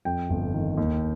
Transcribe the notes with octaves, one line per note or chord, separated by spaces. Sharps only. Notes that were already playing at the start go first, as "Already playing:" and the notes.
F2 G5
G1
D#3
D#2